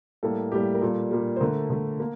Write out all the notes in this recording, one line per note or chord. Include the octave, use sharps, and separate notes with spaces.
A2 G3 A#3 A4
A2 G3 A#3 G4
A#4
A#2 G3 A#3 A4
A#2 G3 A#3
C5
D3 A3 A#4
D3 A3
A#3